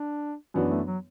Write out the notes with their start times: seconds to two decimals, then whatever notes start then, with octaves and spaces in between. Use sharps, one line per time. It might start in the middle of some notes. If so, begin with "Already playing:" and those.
Already playing: D4
0.54 F#2 E3 B3 D4 F#4
0.70 A3
0.87 F#3